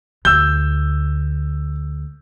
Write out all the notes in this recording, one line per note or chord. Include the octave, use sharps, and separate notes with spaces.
D2 E6 G6